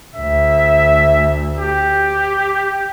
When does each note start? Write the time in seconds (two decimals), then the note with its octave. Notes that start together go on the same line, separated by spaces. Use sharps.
0.16 D2 E5
1.57 G4